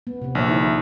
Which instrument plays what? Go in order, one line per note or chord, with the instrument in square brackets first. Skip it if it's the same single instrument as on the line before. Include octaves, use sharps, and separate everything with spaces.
[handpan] B3
C3 C4
[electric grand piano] A#1 [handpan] D3 C#5 E5
[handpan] D#4 E4